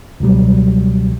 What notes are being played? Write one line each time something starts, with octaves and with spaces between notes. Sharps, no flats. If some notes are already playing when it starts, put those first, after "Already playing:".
C#2 B2 F#3 G3